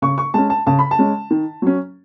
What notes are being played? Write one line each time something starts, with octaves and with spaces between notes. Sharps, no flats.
C#3 C#6
C#6
G#3 C#4 A5
A5
C#3 A5
B5
A5
G#3 C#4
D#3
F#3 C#4